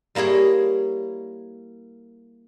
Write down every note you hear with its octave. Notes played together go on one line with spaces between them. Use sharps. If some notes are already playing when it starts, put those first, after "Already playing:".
G3 A#3 E4 G#4 C#5